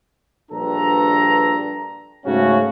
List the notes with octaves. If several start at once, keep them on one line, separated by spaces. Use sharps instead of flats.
A#1 G2 D4 A4 B4 A#5
G#2 C#3 A3 C#4 F#4